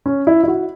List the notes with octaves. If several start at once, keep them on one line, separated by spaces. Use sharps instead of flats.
C#4
E4
E4
F#4